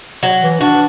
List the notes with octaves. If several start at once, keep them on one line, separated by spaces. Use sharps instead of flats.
F#3
E3
D4 F#4